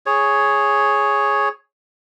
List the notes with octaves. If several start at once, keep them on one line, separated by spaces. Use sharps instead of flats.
G#4 C#5